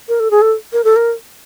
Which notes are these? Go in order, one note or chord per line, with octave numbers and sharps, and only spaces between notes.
A#4
A4
G#4
A4
A#4
A4
A#4